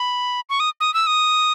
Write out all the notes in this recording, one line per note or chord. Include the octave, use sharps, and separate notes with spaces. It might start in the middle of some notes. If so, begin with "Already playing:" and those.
Already playing: B5
C#6
D#6
D#6
E6
D#6